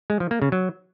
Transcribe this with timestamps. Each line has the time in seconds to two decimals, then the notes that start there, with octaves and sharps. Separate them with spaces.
0.10 G#3
0.20 F3
0.31 A#3
0.42 C#3
0.52 F#3